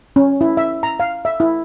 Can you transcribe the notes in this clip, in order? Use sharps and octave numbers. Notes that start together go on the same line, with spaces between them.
C#4
E4
E5
A#5
F5
E5
E4